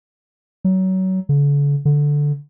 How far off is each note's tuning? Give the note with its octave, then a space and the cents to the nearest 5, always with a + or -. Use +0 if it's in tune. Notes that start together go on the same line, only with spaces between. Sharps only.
F#3 +25
D3 -45
D3 -5